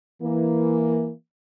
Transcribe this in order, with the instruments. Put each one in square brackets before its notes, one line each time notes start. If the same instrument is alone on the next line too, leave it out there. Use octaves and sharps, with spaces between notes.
[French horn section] E3 A#3